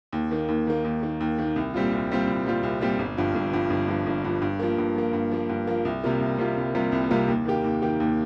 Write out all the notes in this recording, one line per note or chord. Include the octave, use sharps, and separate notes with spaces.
D#2
D#3 A#3
D#2
D#3 A#3
D#2
D#3 A#3
D#2
D#3 A#3
C2
A#2 G3 C4 F4
C2
A#2 G3 C4 F4
C2
A#2 G3 C4 F4
C2
A#2 G3 C4 F4
G1
G2 F3
G1
G2 F3
G1
G2 F3
G1
G2 F3
G2
F3 A#3
G2
F3 A#3
G2
F3 A#3
G2
F3 A#3
C2
C3 G3 A#3 F4
C2
C3 G3 A#3 F4
C2
C3 G3 A#3 F4
C2
C3 G3 A#3 F4
D#2
D#3 A#3 G4
D#2
D#3 A#3 G4
D#2